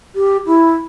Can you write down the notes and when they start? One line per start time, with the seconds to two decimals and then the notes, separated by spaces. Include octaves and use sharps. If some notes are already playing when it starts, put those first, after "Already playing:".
0.15 G4
0.46 E4